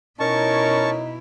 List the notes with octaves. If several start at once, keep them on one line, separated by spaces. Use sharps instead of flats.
B2 C#4 D#4 E4 A#4 C#5 A5 C#6